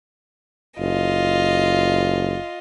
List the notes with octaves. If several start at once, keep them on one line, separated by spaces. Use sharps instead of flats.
F#1 F4 D#5